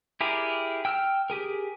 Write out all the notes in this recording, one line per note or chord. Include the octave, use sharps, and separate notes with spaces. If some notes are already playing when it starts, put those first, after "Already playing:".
E4 G4 G#4 A#4 D5
G5 E6 F6
G4 G#4 A#4